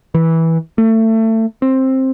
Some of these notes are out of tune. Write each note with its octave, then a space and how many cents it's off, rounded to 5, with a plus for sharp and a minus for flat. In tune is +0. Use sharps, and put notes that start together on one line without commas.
E3 -15
A3 +25
C4 +10